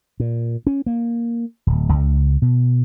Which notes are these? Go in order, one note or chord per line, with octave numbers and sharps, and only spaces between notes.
A#2
C#4
A#3
D1
C#2
B2